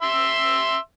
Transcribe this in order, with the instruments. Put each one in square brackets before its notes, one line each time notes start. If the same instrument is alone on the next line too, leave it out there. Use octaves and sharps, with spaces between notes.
[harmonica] E5 C6 E6